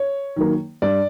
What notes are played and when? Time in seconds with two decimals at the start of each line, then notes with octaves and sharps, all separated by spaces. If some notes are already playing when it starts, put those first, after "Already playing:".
Already playing: C#5
0.36 D#3 F#3 A#3
0.82 G2 D5